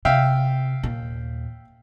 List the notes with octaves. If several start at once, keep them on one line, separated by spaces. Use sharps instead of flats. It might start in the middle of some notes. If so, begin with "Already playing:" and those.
C3 E5 F5 G5
D#2 A#2